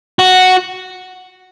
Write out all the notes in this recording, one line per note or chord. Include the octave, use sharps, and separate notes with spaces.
F#4